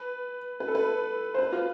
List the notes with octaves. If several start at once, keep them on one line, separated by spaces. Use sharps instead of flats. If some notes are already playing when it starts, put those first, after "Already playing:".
Already playing: B4
B4
A4
B4
C5
B4
F4